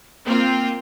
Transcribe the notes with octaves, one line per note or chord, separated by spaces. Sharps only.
A#3 C4 F4